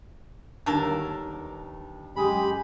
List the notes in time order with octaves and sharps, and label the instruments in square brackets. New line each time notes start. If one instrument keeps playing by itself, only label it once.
[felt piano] G1 D#2 [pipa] F#3 A4 A#4
[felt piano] F#2 D#6 [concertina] G#3 B5 [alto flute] G4